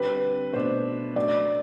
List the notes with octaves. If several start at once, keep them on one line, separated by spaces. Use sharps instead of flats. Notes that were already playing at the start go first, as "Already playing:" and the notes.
Already playing: D3 G3 C4 B4
B2 A3 D4 C5
F#3 A3 D4 D5